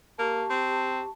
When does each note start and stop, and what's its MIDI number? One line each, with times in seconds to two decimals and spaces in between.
0.19 0.45 58
0.19 1.10 67
0.19 1.10 81
0.19 1.10 85
0.50 1.00 60